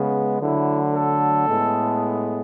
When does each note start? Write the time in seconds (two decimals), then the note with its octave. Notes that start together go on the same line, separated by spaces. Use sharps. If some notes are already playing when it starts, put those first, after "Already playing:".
Already playing: C#3 G#3 B3
0.41 D3 F#3 A3 E4
0.94 A4
1.48 A2 G#3 B3